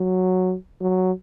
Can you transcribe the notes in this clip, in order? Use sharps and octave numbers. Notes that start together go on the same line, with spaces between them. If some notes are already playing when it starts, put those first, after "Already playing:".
Already playing: F#3
F#3